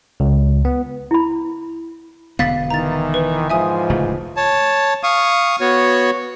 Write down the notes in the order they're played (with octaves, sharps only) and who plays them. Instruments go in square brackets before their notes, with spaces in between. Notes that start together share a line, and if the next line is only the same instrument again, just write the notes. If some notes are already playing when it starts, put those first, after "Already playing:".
[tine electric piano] C#2
B3
[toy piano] E4 B5
[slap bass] E1 D3 B3 [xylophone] F5 A6 B6
[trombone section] D#3 E3 [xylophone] A#5 A6
[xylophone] B4
[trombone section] G#2 E3 F3 [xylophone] E5 G#5 D#6
[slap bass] D1 C#3 A3
[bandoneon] C#5 A5
F5 C#6 D#6
B3 F#4 C#5